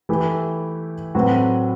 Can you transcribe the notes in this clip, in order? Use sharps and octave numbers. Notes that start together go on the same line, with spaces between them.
E3 A3 E4 G4 B4
A2 F#3 C4 F#4 B4